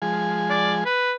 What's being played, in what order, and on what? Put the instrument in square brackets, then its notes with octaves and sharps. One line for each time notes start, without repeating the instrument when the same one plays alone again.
[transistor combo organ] F3 G#3 G#4
[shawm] D5
B4